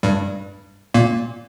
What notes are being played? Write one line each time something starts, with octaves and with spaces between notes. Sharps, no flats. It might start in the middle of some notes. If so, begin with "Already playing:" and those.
G2 G3
A#2 A#3